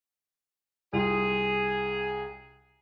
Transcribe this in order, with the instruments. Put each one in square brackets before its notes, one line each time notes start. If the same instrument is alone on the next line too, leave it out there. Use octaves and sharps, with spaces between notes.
[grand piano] C2 F4 G5 [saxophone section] G#4